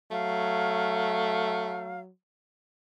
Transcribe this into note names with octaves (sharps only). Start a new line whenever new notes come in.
F#3 A3 F5